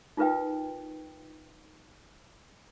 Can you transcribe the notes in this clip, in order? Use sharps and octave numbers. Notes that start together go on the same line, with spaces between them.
D#4 F4 A#4 B4 F5 G5